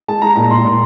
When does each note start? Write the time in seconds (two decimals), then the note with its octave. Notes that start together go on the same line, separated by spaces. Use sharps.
0.08 G#3 A5
0.22 G#3 A#5
0.36 A#2 A#5
0.51 A#2 C6
0.65 A#2